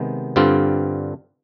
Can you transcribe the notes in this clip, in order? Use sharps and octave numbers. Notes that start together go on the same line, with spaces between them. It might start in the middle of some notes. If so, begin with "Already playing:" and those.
Already playing: C3 D#3 G#3 B3
G2 D3 G3 C4 F4